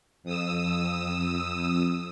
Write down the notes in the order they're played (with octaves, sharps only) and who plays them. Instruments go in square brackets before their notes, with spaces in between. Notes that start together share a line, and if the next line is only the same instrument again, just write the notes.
[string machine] F2 D#6 E6